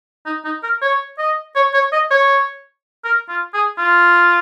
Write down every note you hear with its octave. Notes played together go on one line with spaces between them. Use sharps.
D#4
D#4
A#4
C#5
D#5
C#5
C#5
D#5
C#5
A#4
F4
G#4
F4